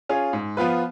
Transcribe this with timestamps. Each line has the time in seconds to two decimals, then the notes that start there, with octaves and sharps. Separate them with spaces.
0.09 C#4 F4 G#4
0.33 G#2
0.57 F3 B3 F4 B4